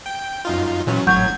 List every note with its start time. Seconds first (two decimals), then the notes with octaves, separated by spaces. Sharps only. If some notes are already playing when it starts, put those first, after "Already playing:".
0.06 G5
0.45 F#2 D#4 F4
0.87 A#2 E3 F#3 C#4
1.07 G#1 A2 F#3 F#5 C#6 G6 G#6